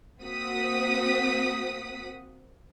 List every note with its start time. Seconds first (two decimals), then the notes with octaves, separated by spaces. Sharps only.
0.20 A#3 C4 F#4 F#5 D#6 B6